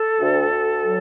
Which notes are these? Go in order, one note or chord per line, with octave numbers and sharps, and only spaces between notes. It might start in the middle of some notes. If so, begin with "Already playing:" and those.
Already playing: A4
D2
D2
F#3